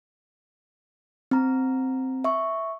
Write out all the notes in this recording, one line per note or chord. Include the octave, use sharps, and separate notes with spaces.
C4 A#5
E5 C#6